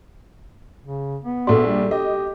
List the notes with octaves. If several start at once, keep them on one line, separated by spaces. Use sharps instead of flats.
C#3
B3
A#1 F#4 A4 D5
G3
G4 D#5